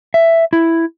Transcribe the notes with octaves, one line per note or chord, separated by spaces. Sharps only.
E5
E4